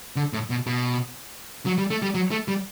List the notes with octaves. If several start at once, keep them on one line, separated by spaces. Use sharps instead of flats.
D3
A2
B2
B2
F#3
G3
A3
G3
F#3
A3
G3